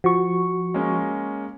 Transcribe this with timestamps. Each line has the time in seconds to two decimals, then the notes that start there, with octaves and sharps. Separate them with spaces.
0.04 F3 F#4 C#6
0.74 G#3 A#3 C#4